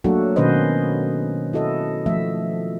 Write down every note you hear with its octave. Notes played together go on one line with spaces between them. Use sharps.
F#3 A3 A#3 D4 F#4 A4
B2 D#3 C#4 B4 C5 D#5
E4 F#4 A4 D#5
F3 A3 E5